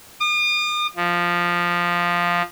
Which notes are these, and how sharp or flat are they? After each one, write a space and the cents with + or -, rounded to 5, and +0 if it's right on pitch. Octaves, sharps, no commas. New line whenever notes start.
D#6 -45
F3 +0